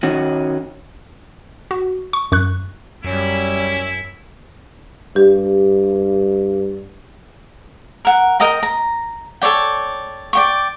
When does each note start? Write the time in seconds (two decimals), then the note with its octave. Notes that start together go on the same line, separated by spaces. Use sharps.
0.03 D#3 C#4 F#4
1.71 F#4
2.13 C#6
2.32 F#2 C#6 F#6
3.04 F#2 G3 C#4 E4
5.16 G2 G4
8.05 A#4 F#5
8.40 A#4 D#5 G5 A#5
8.63 A#5
9.42 A4 C#5 D5 G5
10.33 D5 G5 C#6